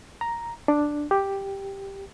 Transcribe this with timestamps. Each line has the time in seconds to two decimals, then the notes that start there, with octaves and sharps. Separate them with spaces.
0.21 A#5
0.68 D4
1.11 G4